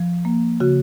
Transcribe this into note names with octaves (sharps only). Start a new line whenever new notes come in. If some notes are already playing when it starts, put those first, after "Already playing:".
Already playing: F3
A#3
C#3 F#4